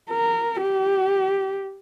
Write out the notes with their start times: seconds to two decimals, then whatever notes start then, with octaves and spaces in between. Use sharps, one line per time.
0.10 A#4
0.62 G4